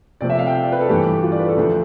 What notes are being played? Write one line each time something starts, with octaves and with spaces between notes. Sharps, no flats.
C3 F3 A3 C4 D5
E5
F5
G5
F5
D5
B4
A4
G2 E3 A3 D4 G4
F4
D5
B4
A4
D2 D3 F3